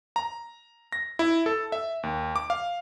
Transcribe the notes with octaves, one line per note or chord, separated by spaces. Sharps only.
A#5
A#6
E4
A4
E5
D#2
D6
F5